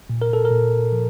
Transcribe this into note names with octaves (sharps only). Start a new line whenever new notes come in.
A#2
A#4
A4
A#4
A#2
F3